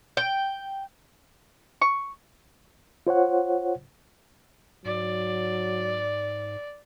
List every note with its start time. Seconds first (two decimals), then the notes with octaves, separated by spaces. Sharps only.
0.17 G5
1.81 C#6
3.07 F4 C5 C#5 F#5
4.85 G#2 F#3 D5